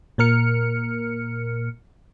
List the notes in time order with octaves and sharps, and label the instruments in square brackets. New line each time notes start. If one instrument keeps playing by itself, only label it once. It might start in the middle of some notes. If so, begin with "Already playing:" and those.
[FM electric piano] A#2 A#3 A#4 F6 C#7